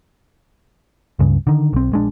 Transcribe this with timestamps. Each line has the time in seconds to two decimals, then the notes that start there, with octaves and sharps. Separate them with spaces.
1.19 C#2 G2 C#3
1.47 D3 D#3
1.73 B1 C4
1.92 A#1 G#3 D4